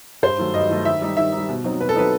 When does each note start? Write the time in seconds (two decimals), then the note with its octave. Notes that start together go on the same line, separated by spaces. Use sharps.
0.23 G2 C5
0.38 D#3 F#3 A3
0.54 G2 D#5
0.69 D#3 F#3 A3
0.85 D#3 E5
1.02 G3 D#4
1.17 D#3 E5
1.32 G3 D#4
1.49 B2
1.64 F#3 C4 D#4
1.80 B2 B4
1.89 A4
1.96 F#3 C4 D#4 B4